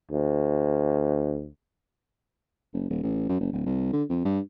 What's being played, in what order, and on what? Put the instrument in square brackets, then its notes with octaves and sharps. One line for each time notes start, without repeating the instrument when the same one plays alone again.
[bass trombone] D2
[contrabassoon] F#1
D#1
A1
F#2
F#1
D1
C2
D3
F2
G2